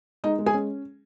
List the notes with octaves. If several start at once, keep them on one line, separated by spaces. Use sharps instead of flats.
G#3 D#4 D#5
G#3
G#4 G#5
C#4